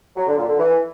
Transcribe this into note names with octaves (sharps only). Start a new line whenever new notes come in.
F#3
D3
A#2
D3
E3